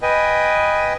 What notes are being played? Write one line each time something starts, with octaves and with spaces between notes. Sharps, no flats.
B4 D#5 G5 G#5